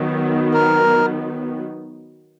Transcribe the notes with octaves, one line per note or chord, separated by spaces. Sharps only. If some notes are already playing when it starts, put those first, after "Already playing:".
Already playing: D#3 F#3 B3
A#4